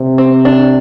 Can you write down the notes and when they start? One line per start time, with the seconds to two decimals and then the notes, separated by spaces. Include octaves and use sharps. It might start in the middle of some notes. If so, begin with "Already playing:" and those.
Already playing: C3
0.18 C4
0.45 D4